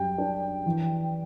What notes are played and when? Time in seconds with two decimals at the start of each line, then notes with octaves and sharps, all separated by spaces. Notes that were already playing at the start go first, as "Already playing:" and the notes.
Already playing: F#2 G3 G5
0.18 D4
0.66 E3